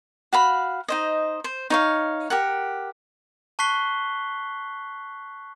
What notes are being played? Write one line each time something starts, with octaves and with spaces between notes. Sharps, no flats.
F#4 F5 B5
D#4 C5 D#5
C5
D#4 C#5 F5
G4 A#4 F#5
A5 C#6 F#6 B6 C7 G7